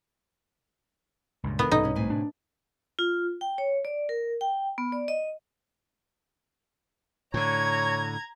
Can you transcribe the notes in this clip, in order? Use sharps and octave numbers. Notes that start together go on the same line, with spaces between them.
C#2 G2 A#2
D3 E3 B3 A#4
C2 G#2 B2 C#4 D#4 A4
C#4 G#4
A2 C3 G#5
D4
F4
G5
C#5
D5
A#4
G5
B3
D5
D#5
A2 D3 C#5 A#5 G#6